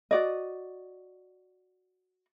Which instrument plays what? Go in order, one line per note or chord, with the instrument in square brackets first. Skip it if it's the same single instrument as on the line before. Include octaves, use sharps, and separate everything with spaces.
[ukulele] F#4 D5 D#5